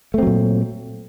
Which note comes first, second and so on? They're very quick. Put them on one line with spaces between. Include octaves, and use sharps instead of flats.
A3 C4 F#3 A#2